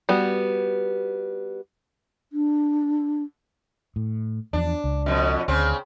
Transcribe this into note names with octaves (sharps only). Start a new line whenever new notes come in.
G3 B3 F#4
D4
A2
E2 F3 D4
C#2
F2 B2
D2 C#3 C4